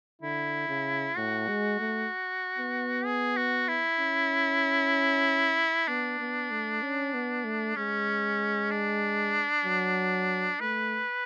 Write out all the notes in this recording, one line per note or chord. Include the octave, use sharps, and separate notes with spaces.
D3 E4
C#3
A2 F#4
G#3
A3
B3
G#4
F#4
E4
C#4
B3 D4
B3
A3
C#4
B3
A3
G#3 C#4
D4
F#3
A3 B4